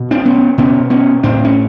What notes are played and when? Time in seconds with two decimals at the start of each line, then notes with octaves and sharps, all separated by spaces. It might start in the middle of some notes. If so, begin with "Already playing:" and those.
Already playing: B2
0.11 C4 D4
0.25 B3 C#4
0.58 B2 B3 C#4
0.90 B3 C#4
1.23 A2 C4 D4
1.45 C#4